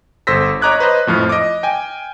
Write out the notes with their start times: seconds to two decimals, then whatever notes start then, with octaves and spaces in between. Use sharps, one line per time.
0.27 G1 A4 C5 E6 A#6 B6
0.62 C#5 D#5 A#5 D6 F#6 G#6
0.80 B4 C5 D#5
1.07 F2 A2 F3 F6
1.29 D#5 D6
1.63 G5 G#5